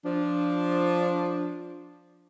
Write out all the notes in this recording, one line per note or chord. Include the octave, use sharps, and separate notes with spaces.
F3 D4